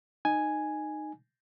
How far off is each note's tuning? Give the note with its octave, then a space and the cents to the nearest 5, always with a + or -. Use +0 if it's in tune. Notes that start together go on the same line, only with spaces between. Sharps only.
D#4 -15 G#5 +0